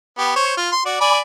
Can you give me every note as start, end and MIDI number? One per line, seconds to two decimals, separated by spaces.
0.18 0.33 59
0.18 0.33 67
0.36 0.54 72
0.36 0.54 73
0.57 0.70 65
0.72 0.83 84
0.86 0.97 66
0.86 0.97 74
1.01 1.19 74
1.01 1.19 80
1.01 1.19 83